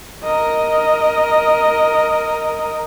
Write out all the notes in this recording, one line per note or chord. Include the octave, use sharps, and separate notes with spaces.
A#4 D#5